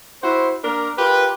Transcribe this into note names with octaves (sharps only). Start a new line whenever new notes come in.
E4 F#4 C5
A#3 D4 A#4
F4 G4 A#4 B4